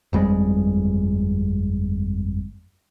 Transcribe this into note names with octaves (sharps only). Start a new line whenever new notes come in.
G1 F2 G3 G#3